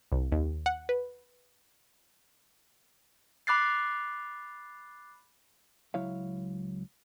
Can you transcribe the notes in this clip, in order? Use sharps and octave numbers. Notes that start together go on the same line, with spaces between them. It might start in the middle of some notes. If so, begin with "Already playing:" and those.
C2
D#2
F#5
B4
B5 D6 F#6 A6 C7
C#2 F#3 E4 C#5 F5